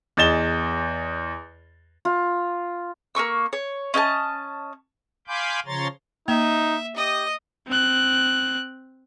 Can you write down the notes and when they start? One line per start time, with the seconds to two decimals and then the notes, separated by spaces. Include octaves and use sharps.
0.17 E2 G#4 D#5 A6 E7 G7
2.05 F4
3.15 A#3 C#4 C#6 E6
3.53 C#5
3.94 C#4 D#5 G5 A5
5.28 F5 G#5 B5 C6 D6 G6
5.66 C#3 F3 C#5 A#5 C6 A6
6.28 A#3 D#4 E5
6.96 G4 D#5 D#6
7.68 C4 F#6